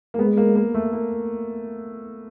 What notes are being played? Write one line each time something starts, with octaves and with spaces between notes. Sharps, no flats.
A#3
G#3 B3
A#3
A#3
A3
A#3